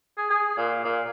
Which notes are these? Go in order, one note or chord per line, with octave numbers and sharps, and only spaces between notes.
G#4
G#4
A#2
A#2